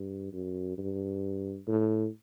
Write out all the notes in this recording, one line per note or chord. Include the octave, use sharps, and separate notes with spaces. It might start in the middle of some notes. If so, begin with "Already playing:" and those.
Already playing: G2
F#2
G2
A2